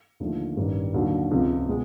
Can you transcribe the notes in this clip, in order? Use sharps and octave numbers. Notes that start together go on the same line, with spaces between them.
D#2 D3 F3 A3
A1 G2 D#3 G3
D#2 D3 F#3
C#2 C3 F3
B2 G#3